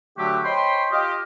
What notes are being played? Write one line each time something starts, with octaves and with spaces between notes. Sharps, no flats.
D3 F#3 A3 F#4 G4
C5 C#5 D#5 G5 B5 C6
F4 G4 D#5 F5